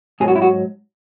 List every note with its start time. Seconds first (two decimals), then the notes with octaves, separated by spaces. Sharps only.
0.20 G#2 F#3 G#4
0.28 F#4
0.36 E4
0.42 F#4